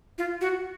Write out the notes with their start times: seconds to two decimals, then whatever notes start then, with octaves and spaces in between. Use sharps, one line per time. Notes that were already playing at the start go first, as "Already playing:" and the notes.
0.18 F4
0.41 F#4